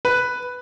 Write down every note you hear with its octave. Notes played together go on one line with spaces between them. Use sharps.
B4